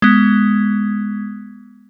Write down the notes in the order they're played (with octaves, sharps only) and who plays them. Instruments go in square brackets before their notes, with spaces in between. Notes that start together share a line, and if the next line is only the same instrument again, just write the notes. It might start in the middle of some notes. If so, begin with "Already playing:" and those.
[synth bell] G#3 B3